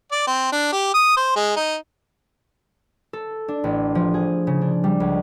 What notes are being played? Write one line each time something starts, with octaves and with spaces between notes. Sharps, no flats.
D5
C4
D4
G4
D#6
C5
G#3
D#4
A4
D4
A1
F3
G#4
C#3
D4
G3
C#2